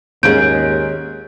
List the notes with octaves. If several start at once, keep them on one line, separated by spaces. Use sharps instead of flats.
D#2 G#2 C#4 G#4 G6 D7